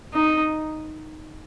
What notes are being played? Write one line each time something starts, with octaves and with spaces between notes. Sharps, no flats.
D#4